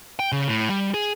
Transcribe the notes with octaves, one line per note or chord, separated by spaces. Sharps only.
G5
C#3
A2
G3
G#4